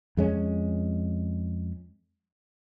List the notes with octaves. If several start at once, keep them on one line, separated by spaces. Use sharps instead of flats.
F2 G#3 C#4